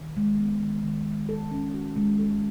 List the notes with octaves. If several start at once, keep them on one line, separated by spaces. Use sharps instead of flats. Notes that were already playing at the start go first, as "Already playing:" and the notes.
Already playing: D#3
G#3
B3
D#3
D#3
G#3
A4
C#4
F#4
G#3
A4